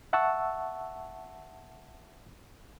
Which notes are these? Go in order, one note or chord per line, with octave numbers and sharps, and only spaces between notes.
E5 F#5 A5 C#6 E6